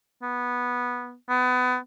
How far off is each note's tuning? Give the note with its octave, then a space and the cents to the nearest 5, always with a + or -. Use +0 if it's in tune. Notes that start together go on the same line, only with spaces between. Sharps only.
B3 -10
B3 +25